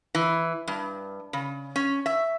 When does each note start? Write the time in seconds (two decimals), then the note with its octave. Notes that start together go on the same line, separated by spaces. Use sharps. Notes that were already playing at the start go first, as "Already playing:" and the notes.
0.15 E3
0.68 G2
1.33 C#3
1.76 C#4
2.06 E5